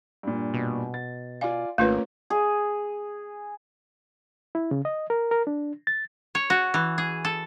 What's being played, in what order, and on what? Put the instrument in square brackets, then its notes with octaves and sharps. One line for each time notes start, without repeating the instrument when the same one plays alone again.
[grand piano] G2 A#2
[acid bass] B2
[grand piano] A6
[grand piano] F4 D5 G#5 [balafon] F5
[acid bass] G#1 [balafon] A3 F4 B4 [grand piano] A#3 C#4
[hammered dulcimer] G#4
[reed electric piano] E4
C#3
D#5
A#4
A#4
D4
A6
[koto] C#5
F#4
E3
G#4
A4